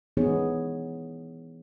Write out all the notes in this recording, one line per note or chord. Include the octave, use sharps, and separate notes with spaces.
E3 B3 D#4 G#4 C#5